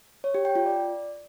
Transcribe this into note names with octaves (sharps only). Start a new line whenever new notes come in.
C#5
G4
G5
F4
D5